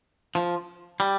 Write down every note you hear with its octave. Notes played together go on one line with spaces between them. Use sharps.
F3
G3